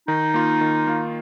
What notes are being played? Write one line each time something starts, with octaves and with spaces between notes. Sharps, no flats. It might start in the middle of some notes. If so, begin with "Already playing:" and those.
D#3 D#4
A#3 F4
D#3
A#3 F4